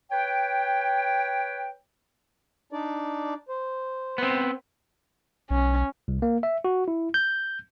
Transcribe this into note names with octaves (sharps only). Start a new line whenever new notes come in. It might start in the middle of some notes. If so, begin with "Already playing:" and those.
B4 C#5 G5
D4 D#4 D5
C5
B3 C4
B1 C#4
C2
A#3
E5
F#4
E4
G6